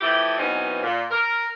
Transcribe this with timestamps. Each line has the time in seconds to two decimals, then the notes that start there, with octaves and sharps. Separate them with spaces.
0.01 E3 F3 A3 E4 G4
0.38 F#2 B2 E3 C4 C#4 D#4
0.82 A#2
1.11 A#4